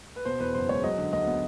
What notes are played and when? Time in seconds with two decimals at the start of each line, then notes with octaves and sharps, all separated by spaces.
0.16 B4
0.25 B2 C5
0.40 E2 B4
0.54 F#1 C5
0.69 G#3 C#5
0.84 F#3 D#5
0.98 D3
1.13 D2 D#5
1.27 B3